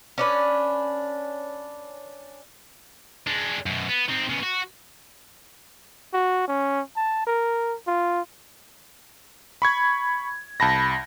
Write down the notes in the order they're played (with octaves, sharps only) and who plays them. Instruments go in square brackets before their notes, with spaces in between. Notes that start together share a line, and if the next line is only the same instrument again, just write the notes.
[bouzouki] C#4 D4 B4
[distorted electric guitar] G#3 D4
F#2 B2
B3
D#3 C4
C#3 B3
F#4
[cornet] F#4
C#4
A5
A#4
F4
[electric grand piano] B5 C#6 G#6
C2 A5 B5 A#6